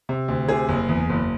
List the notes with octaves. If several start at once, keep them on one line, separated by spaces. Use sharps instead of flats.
C3
D2
C3 G#4
F#1
E2
F#1